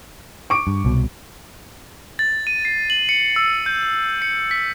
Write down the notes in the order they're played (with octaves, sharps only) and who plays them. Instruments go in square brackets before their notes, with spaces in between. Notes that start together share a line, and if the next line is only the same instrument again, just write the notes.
[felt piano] C#6 D6 D7
[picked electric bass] G2
C2 B2
[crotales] A6
D#7
C7
F#7
C#7
E6
G6
C#7
B6